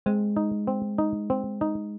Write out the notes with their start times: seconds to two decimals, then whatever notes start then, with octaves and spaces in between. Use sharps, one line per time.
0.06 G#3 C4
0.36 D#4
0.67 C4
0.98 D#4
1.30 C4
1.61 D#4